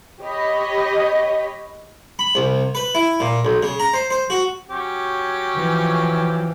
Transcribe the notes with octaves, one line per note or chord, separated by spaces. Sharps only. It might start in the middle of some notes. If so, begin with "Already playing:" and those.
G4 C#5 D#5 B5
B5
C2
B4
E4
A#2
B1
C#3
A#5
C5
C5
F#4
F#3 C#4 G4
E3 F3